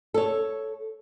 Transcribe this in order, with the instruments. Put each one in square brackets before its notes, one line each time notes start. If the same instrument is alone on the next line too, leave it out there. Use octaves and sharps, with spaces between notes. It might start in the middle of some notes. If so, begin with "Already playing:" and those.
[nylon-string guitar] A4 C#5